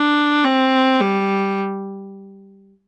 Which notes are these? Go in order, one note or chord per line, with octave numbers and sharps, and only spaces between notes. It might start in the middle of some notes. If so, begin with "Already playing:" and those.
Already playing: D4
C4
G3